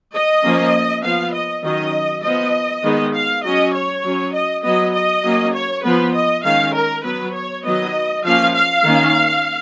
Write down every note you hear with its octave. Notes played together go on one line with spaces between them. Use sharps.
D#5
F3 A#3 C#4
F3 B3 F5
D#5
D#3 F#3 C#4 D#5
F3 B3 D#5
D#3 G#3 B3
F5
F#3 C#4 D#5
C#5
F#3 C#4
D#5
F#3 B3 D#5
D#5
F#3 A#3 C#4
C#5
F3 B3 B4
D#5
D#3 G#3 C#4 F5
A#4
F#3 B3 B4
C#5
D#3 F#3 B3 D#5
F3 A#3 C#4 F5
F5
D#3 A#3 C#4